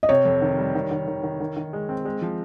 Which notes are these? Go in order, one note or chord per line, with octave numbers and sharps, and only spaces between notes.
D#5
C3 C#5
F2
D#3
G3
D#3
D#3
D#3
D#3
D#3
D#3
G#3
C4
G#3
F3